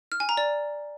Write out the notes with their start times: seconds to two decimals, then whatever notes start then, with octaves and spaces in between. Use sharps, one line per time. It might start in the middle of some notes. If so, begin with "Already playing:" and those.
0.12 F6
0.20 G#5
0.29 A#5
0.37 D5